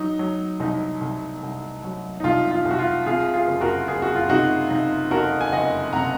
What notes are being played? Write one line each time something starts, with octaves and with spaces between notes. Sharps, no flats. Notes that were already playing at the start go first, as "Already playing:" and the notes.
Already playing: F#3 D#4
F#3
C2 D#4
C2
C2
F#3
D#4
C2 F4
F4
C2
F#4
F4
C3 F4 G#4
F4 G#4
F#1
F#4 A#4
F#1 G#4
F#4
F4
C3 D#4 F#4
C3 D#4
F2 F#4 A#4
G#5
F#1 D#5 F#5
C3 F#5 A#5